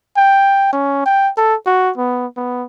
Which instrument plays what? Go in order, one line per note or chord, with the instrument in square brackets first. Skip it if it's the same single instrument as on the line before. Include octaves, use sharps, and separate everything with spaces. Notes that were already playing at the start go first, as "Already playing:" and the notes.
[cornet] G5
C#4
G5
A4
F#4
B3
B3